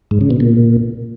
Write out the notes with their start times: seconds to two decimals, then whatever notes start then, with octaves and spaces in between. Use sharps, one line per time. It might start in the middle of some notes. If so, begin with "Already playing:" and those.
0.11 G#2
0.21 C#3
0.31 B2
0.40 A#2